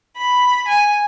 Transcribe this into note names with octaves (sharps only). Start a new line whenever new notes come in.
B5
G#5